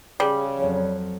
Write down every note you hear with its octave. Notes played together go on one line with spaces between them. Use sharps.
C#3 G3 G#4
F2 F#3 C#5